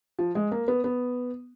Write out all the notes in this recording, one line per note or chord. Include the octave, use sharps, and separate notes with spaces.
F3
G#3
A#3
B3
B3